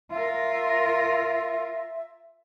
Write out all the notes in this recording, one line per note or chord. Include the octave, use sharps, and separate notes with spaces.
F4 A#4 E5